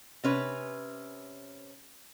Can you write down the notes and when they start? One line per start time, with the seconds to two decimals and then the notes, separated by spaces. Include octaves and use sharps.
0.24 C3 C#4 B4